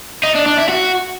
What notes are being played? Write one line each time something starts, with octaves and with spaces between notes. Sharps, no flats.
D#4
D4
D4
E4
F#4